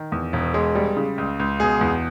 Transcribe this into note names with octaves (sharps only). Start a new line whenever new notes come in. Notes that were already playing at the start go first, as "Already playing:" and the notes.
Already playing: D#3
E2
E1
G#3
G3
C#3
C#2
C#2
B2 G#4
E2